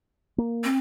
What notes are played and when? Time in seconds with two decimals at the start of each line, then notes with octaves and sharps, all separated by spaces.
0.38 A#3
0.64 C4